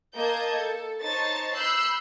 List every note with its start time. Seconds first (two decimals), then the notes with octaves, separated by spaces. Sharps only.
0.13 A#3 D#5 A5 G6 G#6
0.56 A4
1.02 D#4 C5 C#5 A5 A6
1.56 B5 E6 F#6 G6 C7